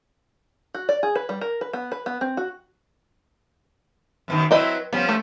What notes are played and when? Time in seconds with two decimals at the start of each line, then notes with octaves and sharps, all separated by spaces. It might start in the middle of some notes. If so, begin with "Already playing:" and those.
0.74 F#4
0.89 D5
1.03 G#4
1.15 B4
1.29 G3
1.41 A#4
1.61 B4
1.73 B3
1.92 B4
2.06 B3
2.21 C4
2.37 F#4
4.28 F#2 B2 D#3
4.51 F#3 C4 E4 B4 D#5 G5
4.93 F3 G3 B3 C#4
5.09 A3